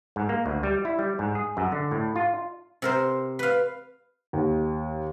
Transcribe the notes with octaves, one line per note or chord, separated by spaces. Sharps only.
G#2
A#3
D2
G3
E4
G3
G#2
G#4
F#2
D3
A2
F4
C3 A#4 C5
B4 F5
D#2